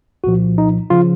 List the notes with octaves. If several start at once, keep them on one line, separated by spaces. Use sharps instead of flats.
C2 A#2 F3 F#4
D#4
C#3 F3 F4